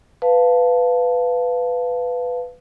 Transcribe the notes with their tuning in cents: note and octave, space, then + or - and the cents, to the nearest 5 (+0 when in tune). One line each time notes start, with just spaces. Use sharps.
B4 +10 F5 +0 A5 +0